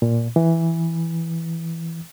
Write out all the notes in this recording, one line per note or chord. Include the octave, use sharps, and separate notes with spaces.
A#2
E3